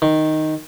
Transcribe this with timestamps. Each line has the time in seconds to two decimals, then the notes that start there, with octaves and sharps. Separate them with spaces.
0.02 D#3